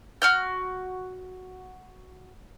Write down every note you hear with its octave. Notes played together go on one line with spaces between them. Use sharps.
F#4 F6 G6